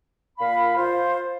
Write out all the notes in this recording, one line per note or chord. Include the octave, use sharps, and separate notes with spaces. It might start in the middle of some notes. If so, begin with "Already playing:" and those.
A#2 F5 B5
F4 C5